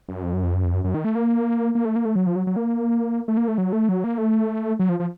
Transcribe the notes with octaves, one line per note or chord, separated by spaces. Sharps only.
F#2
F2
F#2
F2
F#2
F2
F#2
F#2
D#3
A3
A#3
A#3
A3
A#3
A3
F#3
F3
F#3
F#3
A#3
A3
A#3
A3
F#3
A3
F#3
A#3
A3
F#3
F3
F3